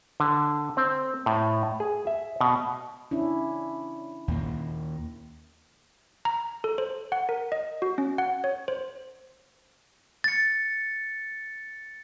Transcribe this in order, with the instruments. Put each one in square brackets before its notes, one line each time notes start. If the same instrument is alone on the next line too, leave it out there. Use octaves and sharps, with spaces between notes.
[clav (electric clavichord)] D3
C4
A2
G#4
E5
B2
[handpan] C#4 D4 E4
[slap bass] D#2 A#2 A#3
[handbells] A#5
A4
C5
F#5
A#4
D#5
F#4
C#4
F#5
C#5
C5
[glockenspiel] A6 C#7